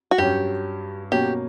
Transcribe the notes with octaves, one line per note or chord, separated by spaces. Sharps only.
F#4
G2 F#3 C#4 G4
B2 F#3 A#3 C#4 G4